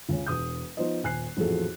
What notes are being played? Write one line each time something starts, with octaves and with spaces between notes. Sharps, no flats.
C#2 C#3
E1 D#6 G6
F3 B3 D#4 C5 D#5
D#1 G#5 F#6 C7
A1 F2 A#2 F#4 G#4 A4